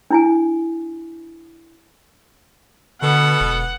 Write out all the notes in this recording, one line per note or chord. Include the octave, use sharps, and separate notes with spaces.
D4 E4 G#5
B2 D3 B3 A4 F#5
E1